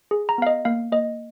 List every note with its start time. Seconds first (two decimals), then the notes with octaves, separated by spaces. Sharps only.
0.11 G#4
0.29 A#5
0.38 B3 F5
0.47 D#5
0.65 A#3 F5
0.92 A#3 D#5